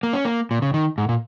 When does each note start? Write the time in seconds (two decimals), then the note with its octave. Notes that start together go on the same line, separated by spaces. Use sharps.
0.03 A#3
0.13 C#4
0.25 A#3
0.51 A#2
0.62 C#3
0.74 D#3
0.98 G#2
1.09 A#2